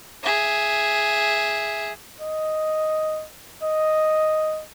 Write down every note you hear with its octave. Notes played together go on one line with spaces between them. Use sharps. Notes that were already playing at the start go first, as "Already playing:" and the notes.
G#4 E5
D#5
D#5